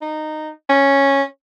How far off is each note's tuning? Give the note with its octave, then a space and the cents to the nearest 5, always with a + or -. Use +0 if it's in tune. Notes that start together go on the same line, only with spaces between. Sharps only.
D#4 -15
C#4 -5